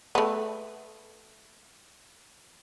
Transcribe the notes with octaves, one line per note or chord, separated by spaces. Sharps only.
A3 B3